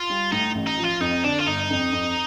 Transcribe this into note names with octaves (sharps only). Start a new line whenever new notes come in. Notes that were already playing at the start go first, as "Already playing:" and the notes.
Already playing: F4
G3
A2 D#4
A1
D#4
F3
F4
F2 D#4
D3 D4
F4
G1 D#4
F2
F2